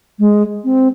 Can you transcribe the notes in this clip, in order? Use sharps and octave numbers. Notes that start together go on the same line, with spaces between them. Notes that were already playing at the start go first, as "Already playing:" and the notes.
G#3
C4